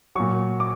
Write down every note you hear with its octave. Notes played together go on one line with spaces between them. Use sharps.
A#2 F#3 C#6
D6